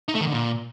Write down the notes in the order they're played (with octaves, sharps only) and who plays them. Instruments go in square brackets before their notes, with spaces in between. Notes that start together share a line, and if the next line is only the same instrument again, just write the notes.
[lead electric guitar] D#4
A3
D#3
D3
A#2